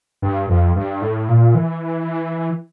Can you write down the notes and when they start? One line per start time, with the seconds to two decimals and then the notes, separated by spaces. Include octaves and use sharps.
0.22 G2
0.49 F2
0.76 G2
1.02 A2
1.29 A#2
1.55 E3